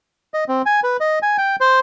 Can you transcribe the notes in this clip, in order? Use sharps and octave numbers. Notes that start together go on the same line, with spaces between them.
D#5
C4
G#5
B4
D#5
G#5
G5
C5